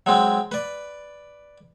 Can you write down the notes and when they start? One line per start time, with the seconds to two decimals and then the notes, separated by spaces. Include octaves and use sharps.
0.06 F#3 G#3 C4
0.52 B4 D5